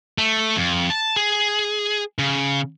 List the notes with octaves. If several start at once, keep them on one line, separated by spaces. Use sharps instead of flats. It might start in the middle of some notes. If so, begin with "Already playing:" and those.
A3
F2
A5
G#4
C#3